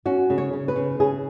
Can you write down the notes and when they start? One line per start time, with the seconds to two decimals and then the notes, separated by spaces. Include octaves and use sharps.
0.05 C#4 F#4
0.30 C#3
0.38 C#5
0.53 C#3
0.68 B4
0.76 C#3
1.00 C#3 G#4